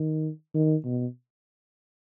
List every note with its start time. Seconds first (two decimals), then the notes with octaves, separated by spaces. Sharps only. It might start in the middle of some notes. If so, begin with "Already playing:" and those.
Already playing: D#3
0.55 D#3
0.85 B2